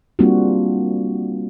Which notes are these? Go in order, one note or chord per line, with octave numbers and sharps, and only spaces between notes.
G3 A#3 C4 D4 F4 F#4